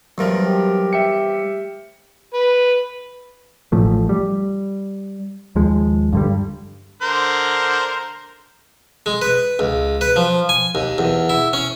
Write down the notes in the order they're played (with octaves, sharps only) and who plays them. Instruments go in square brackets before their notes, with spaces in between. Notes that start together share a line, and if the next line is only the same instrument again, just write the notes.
[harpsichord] E2 G2 F3 [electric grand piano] F#3 A#4 F6
[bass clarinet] G4
[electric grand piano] E5 G5 C#7
[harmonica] B4
[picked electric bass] A1 A2 F3 A3
G3
D#2 F3 G#3
G2 D3 G3
[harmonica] D3 A#4 C5
[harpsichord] G#3
B4
C#2
B4
F3
G#5
D#2
E2
E4
C#4